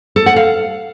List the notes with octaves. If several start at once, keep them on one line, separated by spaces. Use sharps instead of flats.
A4
F#5
F5